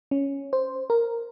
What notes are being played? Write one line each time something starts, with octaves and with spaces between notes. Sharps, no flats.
C#4
C5
A#4